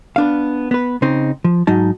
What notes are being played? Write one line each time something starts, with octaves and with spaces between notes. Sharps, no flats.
B3 D4 F5
B3 B4
C#3 C4 D#4 C5
F3
G#2 F#3 D#4 A5